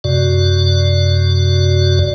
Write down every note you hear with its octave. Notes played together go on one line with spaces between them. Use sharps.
F#2 C3 F#4 D5